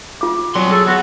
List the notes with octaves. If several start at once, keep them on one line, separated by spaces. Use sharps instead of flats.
F4 D6
F#3 G3 C6
G#4 A4
B3 F#4